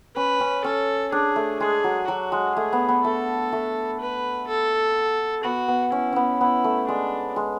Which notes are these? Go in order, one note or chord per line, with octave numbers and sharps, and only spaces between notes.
C#4 B4
C#4
C#4 A4
D4 G#4
A3
G#3 G#4
F#3
F#3 F#4
G#3
A3 G#4
B3
B3
A3 A4
A3
B4
A4
B3 F#4
B3
C#4 E4
B3 C#4
B3 E4
A3
G#3 D4
G#3